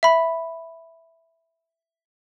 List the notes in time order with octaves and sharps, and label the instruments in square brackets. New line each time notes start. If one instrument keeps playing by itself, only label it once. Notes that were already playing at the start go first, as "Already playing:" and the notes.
[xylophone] E5 B5